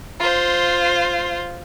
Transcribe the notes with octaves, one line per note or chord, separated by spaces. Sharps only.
F4 C5